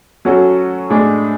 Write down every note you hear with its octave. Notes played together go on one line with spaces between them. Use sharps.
F#3 C#4 F#4 A4
A2 G#3 D4 G#4